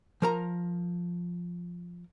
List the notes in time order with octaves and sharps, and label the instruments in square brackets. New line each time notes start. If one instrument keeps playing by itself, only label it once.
[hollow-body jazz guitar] F3 A#4 A#5